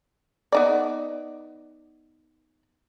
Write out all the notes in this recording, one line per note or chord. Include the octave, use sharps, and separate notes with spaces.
B3 D#4 D5